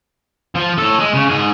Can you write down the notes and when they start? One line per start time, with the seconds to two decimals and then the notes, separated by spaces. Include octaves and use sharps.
0.55 F3
0.78 A2 A4
0.99 G#3
1.14 C#3
1.30 G#2 G#4